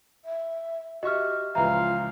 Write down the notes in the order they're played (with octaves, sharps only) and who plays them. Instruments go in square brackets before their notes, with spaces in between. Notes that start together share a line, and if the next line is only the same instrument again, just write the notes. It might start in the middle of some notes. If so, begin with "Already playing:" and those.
[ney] E5
[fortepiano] F#4 E5 C#6 [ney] G4 [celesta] D#5 F6
[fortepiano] C#2 E3 F3 [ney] F4 [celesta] E5 A#5 [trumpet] F5